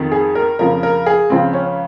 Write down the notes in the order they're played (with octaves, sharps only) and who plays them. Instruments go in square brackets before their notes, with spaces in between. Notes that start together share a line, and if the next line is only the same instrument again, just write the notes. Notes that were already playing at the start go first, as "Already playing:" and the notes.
Already playing: [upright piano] F2 D#3
G#4
A#4
F2 C#3 F3 A#4
A#4
G#4
C#2 C#3 F3 C4
C#4